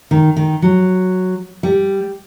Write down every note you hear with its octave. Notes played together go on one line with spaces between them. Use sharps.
D#3
D#3
F#3
G3